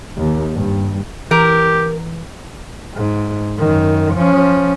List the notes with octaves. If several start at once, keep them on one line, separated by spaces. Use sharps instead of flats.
D#2
G2
E3 G4 A#4
G#2
F#2 D#3
F3 C#4